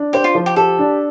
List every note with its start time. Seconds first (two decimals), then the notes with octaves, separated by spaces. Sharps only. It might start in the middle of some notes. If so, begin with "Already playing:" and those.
Already playing: D4
0.13 G4 C5
0.24 F4
0.35 F3
0.46 G4
0.56 G4 A4
0.79 D4